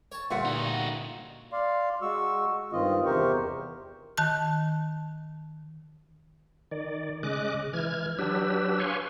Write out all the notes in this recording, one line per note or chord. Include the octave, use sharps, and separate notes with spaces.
C#5 A5
D2 G2 A#2 F4 E5 F#5
D#4 F#4
D5 F5 C6
G#3 F#4 C#6 E6
G2 D#3 C4 F4 D#5
E2 C3 G4 A#4 C5 C#6
D#3 A5 F#6
D#3 D5
C#3 G#3 D#5 D6 F#6
E3 F6 G#6
F#3 D4 G4 B4 E6
B4 C#5 F5 G#5 C6 C#6